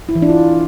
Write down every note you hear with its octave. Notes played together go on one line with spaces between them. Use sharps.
E4
E3
D4
F4